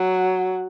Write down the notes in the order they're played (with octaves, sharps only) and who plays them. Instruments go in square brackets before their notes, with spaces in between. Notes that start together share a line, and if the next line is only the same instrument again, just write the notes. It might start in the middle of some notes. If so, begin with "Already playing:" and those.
Already playing: [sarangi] F#3